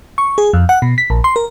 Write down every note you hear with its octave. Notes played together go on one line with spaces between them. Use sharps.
C#6
G#4
F2
F#5
B2
B6
A#1
C6
A#4